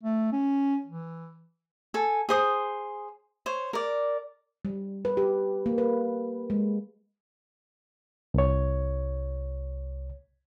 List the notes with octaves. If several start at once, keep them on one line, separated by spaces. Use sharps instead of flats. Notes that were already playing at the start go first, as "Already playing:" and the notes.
A3
C#4
E3
A4 G#5
G#4 C5 D#6
C5 C#5
A#4 D5
G3
B4
G4
A#3
B4
G#3
C2 C#5